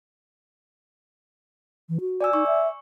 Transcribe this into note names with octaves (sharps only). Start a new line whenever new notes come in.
E3
F#4
D5 G#5 E6
D#4 C#6
E5